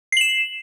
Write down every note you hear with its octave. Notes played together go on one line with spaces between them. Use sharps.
C7 E7 F#7